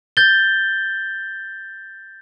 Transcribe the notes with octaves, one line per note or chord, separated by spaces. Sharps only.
G6 A6 G7